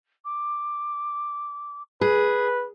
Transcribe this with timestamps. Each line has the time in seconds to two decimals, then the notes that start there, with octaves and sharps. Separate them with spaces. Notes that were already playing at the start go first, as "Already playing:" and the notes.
0.24 D6
2.01 G#4 B4